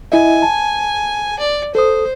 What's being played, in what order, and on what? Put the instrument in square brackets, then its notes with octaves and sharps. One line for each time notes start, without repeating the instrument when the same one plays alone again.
[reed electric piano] E4 D#5 E5 [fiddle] G#5
[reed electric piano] A5
[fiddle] D5
[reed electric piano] A4 D#6 [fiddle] C5